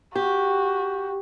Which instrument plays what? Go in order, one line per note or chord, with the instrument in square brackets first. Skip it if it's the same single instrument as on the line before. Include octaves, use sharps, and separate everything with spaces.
[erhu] F#4 [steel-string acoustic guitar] G4